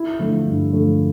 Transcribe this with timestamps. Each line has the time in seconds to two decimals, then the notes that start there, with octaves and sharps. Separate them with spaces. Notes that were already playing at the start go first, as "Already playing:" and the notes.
Already playing: E4
0.19 D3 F3 A3
0.45 G2
0.71 D3 F3 A3